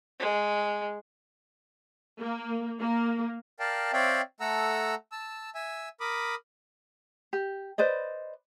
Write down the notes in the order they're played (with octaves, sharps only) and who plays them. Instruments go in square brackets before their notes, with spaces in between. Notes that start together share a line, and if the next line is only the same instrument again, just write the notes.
[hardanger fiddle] G#3
[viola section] A#3
A#3
[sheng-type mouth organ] A#4 D5 F5 G5 A5
C4 C#5 D5 E5 F5 G5
A3 A4 F#5 A#5 E6
A5 E6
E5 G#5 E6
A#4 B5 D6 D#6
[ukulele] G4
B4 C5 D5 D#5